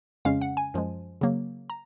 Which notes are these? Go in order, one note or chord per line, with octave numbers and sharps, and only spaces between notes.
F2 C#3 G#3 C#4 F5
F#5
G#5
F#2 F3 G#3
C#3 F#3 A#3
A#5